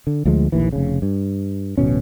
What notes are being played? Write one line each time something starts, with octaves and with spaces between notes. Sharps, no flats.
D3
D2 F3 G#3
A#1 D#2 E3
F1 C#3
G2
D1 A1 B2 C#4